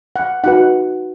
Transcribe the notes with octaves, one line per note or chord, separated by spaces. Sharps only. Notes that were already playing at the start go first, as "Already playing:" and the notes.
F#5
D#4 F#4 B4 F#5